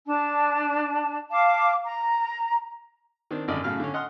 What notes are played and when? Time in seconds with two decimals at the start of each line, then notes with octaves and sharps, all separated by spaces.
0.07 D4 A5
1.30 F5 A5 D6
1.85 A#5
3.31 D#3 C4 D4
3.48 G#1 F#2 D3 D5 D#5
3.64 A2 C#3 F#3 F5 F6
3.80 D3 C#4
3.94 D#5 F#5 C6 F6